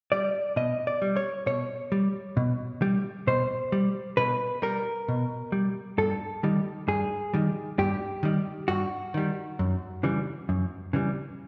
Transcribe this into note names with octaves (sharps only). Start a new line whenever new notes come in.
G3 D5
B2 D#5
D5
G3
C#5
B2 C#5
G3
B2
G3
B2 C5
G3
B2 B4
G3 A#4
B2
G3
G2 A4
D#3 G3
G2 G#4
D#3 G3
G2 G4
D#3 G3
G2 F#4
D#3 G3
F#2
C#3 E3 G3
F#2
C#3 E3 G3